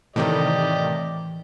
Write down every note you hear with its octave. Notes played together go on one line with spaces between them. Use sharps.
A2 C3 D#3 E3 G4 D5 D#5